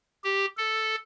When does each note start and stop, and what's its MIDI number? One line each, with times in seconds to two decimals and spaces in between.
0.24 0.46 67
0.57 0.96 69